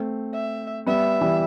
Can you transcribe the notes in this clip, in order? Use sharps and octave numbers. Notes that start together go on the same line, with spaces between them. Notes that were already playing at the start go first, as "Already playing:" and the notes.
Already playing: A3 C4
E5
G3 B3 E5
E3 G3